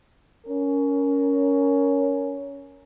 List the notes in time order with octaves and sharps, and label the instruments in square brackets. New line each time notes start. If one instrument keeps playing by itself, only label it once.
[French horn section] C#4 A#4